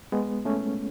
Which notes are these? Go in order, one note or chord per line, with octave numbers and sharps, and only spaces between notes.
G#3 B3
A3 C#4